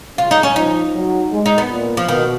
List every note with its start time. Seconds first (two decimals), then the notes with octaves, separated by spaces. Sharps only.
0.18 C#3 F4
0.31 D#4
0.43 C#4
0.56 F3 D#4
0.94 F#3
1.32 G#3
1.46 D#4
1.58 B3
1.70 A#2
1.97 F3
2.08 B2 D#3